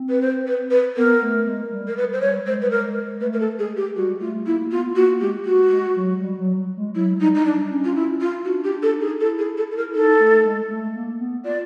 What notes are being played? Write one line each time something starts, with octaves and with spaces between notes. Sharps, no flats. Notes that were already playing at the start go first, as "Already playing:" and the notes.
Already playing: C4
B4
C5
B4
B4
B3 A#4
A3
G#3
G3
A#4
B4
C5
G3 C#5
G#3 C5
B4
A#4
A3 B4
A#4
A4
G#3 G#4
G4
G3 F#4
A3 F4
A#3 E4
B3 F4
A#3 F#4
G#3 G4
F#4
G#3
F#3
G3
F#3
G#3
F#3 E4
G3 D#4
D#4
D4
C#4
F4
E4
F4
D4 F#4
G4
D4
A4
D#4
G#4
E4 A4
G#4
A4
A4
A#4
E4
D#4 A4
A3
G#3
A3
A#3
B3
F4 D5